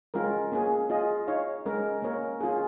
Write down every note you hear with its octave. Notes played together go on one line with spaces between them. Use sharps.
G#3 C#4 F4 A#4
A#3 C#4 G#4
F4 G#4 D#5
D#4 C#5 F5
G#3 C#4 A#4
A#3 C#4 A#4 C#5
C#4 F4 G#4